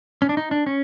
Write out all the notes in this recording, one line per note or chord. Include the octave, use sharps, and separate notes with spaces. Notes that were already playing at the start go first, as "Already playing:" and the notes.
C#4
D4
D#4
D4
C#4